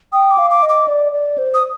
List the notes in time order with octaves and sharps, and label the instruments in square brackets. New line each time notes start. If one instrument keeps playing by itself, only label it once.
[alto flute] G5 [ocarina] D#6
[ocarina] D6
[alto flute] F5
[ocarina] D6
[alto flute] D#5
[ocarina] D6
[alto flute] D5
D5
C5
[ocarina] D#6